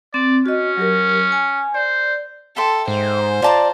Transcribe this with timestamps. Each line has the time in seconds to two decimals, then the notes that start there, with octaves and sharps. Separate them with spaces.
0.14 C4 D5
0.46 C#4 F#4 D#5
0.77 F#3 G4 A#4
1.32 G#5
1.74 C5 D5
2.56 A4 E5 G5 C6
2.88 G#2 C5
3.42 F4 D5 A5 A#5